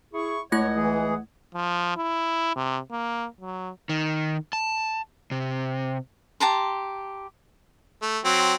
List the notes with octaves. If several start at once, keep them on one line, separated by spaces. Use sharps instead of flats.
E4 G#4 C#6
C#2 A3 E4 C#5 D#5 F#5 G#6
E3 G#4
F3
E4
C3
A#3
F#3
D#3
A5
C3
G4 A5 A#5 C6
A3
F#3 C4